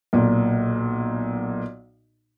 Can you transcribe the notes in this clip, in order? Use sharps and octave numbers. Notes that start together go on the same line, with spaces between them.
B1 A#2